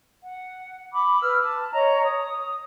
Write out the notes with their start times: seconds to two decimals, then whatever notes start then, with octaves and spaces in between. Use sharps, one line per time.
0.23 F#5
0.93 B5 D6
1.21 B4 E6 F6
1.43 A5
1.73 C#5 D#5 A#5
2.05 D#6